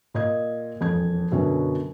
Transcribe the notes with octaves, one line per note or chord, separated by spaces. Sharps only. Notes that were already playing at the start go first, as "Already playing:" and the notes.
A#2 D#5 G#6
E1 F2 C#4 G#6
F#2 B2 D3 F#3 B3 C#4